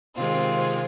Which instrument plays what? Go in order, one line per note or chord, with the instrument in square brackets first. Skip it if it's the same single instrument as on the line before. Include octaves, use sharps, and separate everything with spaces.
[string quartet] C3 D#3 G#3 C4 F4